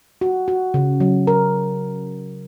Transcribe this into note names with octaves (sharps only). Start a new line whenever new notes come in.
F#4
F#4
C#3
F#3
A#4